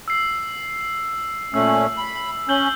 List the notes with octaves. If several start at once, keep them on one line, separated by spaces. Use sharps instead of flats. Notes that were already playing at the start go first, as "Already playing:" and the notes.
E6 C7
A#2 A3 C#4 E6
B5
C#4 G6 F#7 G7